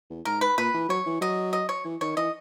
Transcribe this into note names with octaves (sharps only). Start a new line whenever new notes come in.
E2
G#2 A#4
B4
A#2 B4
E3
F#3 C#5
E3
F#3 D#5
D#5
C#5
E3
D#3 C#5
E3 D#5